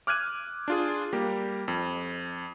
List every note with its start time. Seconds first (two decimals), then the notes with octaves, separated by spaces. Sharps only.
0.07 D6 F6 F#6 G#6 D#7
0.68 D4 F4 G#4
1.13 G3 A#3 G4
1.68 F2